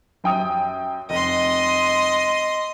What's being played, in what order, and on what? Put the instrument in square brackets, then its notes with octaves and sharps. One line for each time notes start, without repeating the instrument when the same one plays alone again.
[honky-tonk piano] F#2 G5 D#6
[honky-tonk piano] F1 [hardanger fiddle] D#5 C6